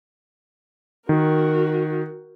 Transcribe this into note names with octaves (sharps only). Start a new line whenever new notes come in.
D#3 F#4 A#4